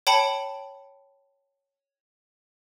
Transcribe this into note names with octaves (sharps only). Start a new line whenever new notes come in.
C#5 G5 A5 B5 C#7 F#7